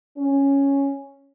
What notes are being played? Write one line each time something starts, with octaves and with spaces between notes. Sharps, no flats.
C#4